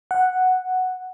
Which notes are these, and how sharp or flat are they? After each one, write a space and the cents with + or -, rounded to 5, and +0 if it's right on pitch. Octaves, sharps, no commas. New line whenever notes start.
F#5 +0